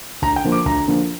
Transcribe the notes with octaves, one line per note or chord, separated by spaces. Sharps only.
D2 A#5
G5
D3 F3 A#3
D6
D2 A#5
D3 F3 A#3